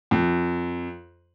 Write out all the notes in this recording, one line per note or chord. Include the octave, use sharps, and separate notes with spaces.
F2